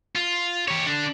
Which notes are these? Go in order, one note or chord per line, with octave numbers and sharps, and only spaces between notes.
F4
G4 C#5
D3 D4